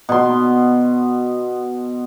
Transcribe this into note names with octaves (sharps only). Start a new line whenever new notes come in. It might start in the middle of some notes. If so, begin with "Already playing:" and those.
B2 C6